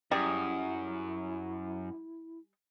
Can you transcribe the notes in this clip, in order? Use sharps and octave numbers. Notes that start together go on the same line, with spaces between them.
F#2 G3 E4 G#4